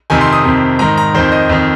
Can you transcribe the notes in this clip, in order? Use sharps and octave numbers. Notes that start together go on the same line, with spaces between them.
F2 C3 D#3 G#5
C6
D#6
F2 C3 D#3
G#2 D#3 A#5
A#5
F2 D#3 C5
D#5
F2 D#3